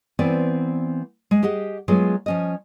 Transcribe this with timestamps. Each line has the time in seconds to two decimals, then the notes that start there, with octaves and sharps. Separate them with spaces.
0.19 E3 B3 C4 C5 D5
1.31 G#3
1.43 G4 G#4 D#5 F#5
1.88 F#3 G#3 A3 B3 F4 G#4
2.26 F3 C#4 D#5